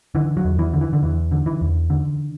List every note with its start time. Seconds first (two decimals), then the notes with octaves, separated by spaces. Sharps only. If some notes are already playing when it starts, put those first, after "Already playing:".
0.15 D3 E3
0.37 F#3
0.45 E2
0.59 E3
0.73 D3
0.81 E3
0.93 D3
1.02 E2 E3
1.31 D3
1.46 E3
1.61 E2
1.90 D3